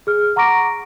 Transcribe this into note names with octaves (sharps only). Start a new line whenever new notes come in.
G#4 F6
F#5 A#5 C#6 D6 A#6 D7